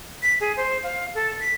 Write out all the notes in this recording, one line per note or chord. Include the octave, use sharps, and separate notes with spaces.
B6
G#4
C5
F5
A4
B6